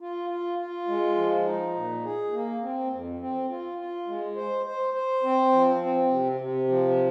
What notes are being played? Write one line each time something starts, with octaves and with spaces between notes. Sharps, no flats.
F4
F4
F4
G#3
F3
D#4
A#2
G#4
A#3
C4
F2
C4
F4
F4
G#3
C5
C5
C5
C4
F3
C4
C3
C3
F3